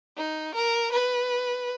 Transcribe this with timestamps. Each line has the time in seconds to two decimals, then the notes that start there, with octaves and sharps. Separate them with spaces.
0.17 D#4
0.55 A#4
0.92 B4